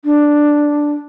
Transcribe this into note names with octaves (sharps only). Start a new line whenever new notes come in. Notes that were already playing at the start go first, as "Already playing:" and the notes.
D4